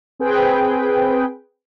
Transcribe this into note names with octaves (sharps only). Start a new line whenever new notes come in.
C4 G#4 B4 G5